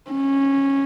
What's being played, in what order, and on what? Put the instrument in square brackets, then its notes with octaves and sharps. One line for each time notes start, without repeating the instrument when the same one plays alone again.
[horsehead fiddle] C#4